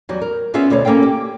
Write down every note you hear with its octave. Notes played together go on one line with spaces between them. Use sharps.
E2 F#3 G3
A#4
B3 C#4 F4 G#4 E5
D2 B2 A4 C5 C#5
A#3 C#4 A4 F5 G5
G4